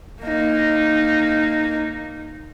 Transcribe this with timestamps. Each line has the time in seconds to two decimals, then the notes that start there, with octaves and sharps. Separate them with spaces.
0.23 A#3 D#4